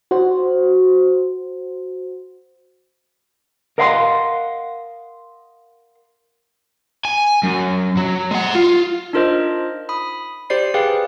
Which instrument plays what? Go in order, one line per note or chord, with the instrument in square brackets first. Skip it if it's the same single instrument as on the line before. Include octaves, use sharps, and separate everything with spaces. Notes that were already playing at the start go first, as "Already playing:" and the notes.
[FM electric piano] F#4 C5
[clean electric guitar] A#4 D#5 F5 F#5 B5 C6
[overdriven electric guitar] G#5
F#2
F#3
G#3 F#5
F4
[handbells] D4 D#4 F4 A#4 C5 D#5
B5 D#6
G4 C5 D5 C7
G4 G#4 B4 F5 G5